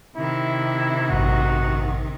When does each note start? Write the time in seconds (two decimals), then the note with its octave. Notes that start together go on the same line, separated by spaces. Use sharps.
0.17 C3 D#3 E4
1.10 A1 G2 F#4